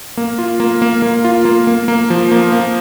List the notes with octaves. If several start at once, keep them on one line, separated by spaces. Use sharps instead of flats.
A#3
F4
A#3
A#3
A#3
F4
A#3
A#3
A#3
F3
A#3
A#3